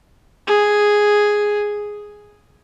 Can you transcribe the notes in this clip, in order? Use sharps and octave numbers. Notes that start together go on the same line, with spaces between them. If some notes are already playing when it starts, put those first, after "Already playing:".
G#4